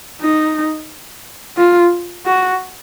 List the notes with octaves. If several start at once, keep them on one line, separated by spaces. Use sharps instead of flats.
D#4
F4
F#4